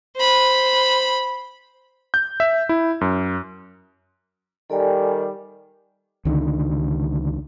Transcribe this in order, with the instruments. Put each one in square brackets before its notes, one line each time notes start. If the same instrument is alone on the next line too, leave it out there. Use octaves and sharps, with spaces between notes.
[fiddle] C5 B5
[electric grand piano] G6
E5
E4
F#2
[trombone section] D#3 G3 [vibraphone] A4 D5 G#5
[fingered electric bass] C#2 D3 D#3